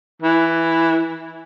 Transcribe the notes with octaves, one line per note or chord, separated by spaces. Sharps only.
E3